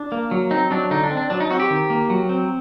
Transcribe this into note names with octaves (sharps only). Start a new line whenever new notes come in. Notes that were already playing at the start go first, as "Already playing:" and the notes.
Already playing: D4
A#3
F#3
C4 D#4
F#3 D4
D3 D#4
D4
C4
D4
F#3 D4
D#4
C4 F#4
G4
D#3
A#3
F#3
C4